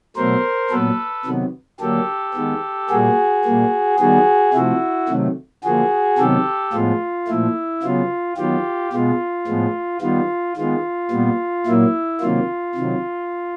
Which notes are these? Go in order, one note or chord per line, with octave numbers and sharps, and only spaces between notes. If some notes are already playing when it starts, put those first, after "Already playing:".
B2 F#3 A3 A#4 C5
A#2 F#3 B3 A4 B4
C3 D#3 F#3 B3
D3 F#3 A#3 G4 A4
D#3 G#3 B3
A#2 G3 A#3 F#4 G#4
A#2 G3 A#3
D#3 G3 B3 F#4 G#4
C3 F3 A3 E4 F#4
C3 D#3 F#3 A3
D3 F3 A#3 F#4 G#4
C3 D#3 F#3 B3 G4 A4
A2 F3 G#3 B3 F4
A#2 F3 A3 E4
C#3 F#3 B3 F4
D#3 F#3 B3 F4 G4
B2 G#3 B3 F4
A2 F3 G#3 B3
D#3 G3 B3 F4
D#3 G#3 B3 F4
A#2 G3 B3
A#2 F#3 A#3 E4
C3 D#3 F#3 A#3 F4
C3 D#3 F#3